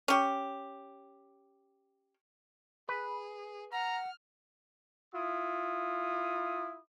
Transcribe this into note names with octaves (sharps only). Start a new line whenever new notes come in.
C#4 G4
G#4 B4
F#5 A#5 F6
E4 F4 D#6